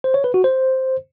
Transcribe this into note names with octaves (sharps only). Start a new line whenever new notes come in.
C5
C#5
B4
F#4
C5